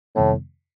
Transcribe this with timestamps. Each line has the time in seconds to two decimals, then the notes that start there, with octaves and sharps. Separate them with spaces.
0.16 F2 A2 C3 D#3 G3 B3